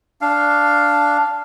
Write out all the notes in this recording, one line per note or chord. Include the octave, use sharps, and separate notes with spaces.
D4 F5